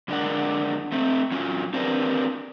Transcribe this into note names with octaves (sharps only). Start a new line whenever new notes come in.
F#2 D3 G#3 D4 A#4 F#5
A3 C4
F#3 C#4 F4
C4 D4 G4 A#4 B4